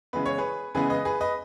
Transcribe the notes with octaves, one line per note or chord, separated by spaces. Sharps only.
C#3 E3 G#3 B3 B4
C#5
G#4 B4
C#3 E3 G#3 B3 G#4 B4
B4 D#5
G#4 B4
B4 D#5